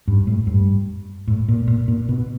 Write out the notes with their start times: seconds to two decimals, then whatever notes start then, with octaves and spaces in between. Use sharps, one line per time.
0.08 G2
0.27 A2
0.47 G2
1.28 A2
1.48 A#2
1.68 A#2
1.88 A#2
2.09 B2